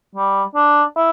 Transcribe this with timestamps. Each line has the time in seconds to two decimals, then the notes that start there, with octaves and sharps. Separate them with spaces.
0.15 G3
0.55 D4
0.96 E4